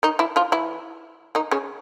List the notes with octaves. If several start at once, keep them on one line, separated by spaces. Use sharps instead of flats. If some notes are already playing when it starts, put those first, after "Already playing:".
D#3 D#4
E3 E4
F3 F4
E3 E4
D#3 D#4
C#3 C#4